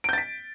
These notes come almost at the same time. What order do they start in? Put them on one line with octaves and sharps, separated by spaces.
D7 G6 A6 B6